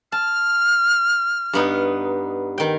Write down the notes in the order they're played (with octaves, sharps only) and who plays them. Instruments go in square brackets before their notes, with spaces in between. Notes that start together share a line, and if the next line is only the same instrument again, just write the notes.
[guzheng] A5 [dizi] F6
[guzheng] G2 B3 D#4
D#3 G5